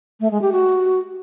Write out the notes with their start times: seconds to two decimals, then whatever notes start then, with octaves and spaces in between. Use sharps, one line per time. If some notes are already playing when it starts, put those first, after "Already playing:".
0.20 A3
0.31 G#3
0.42 G4
0.52 F#4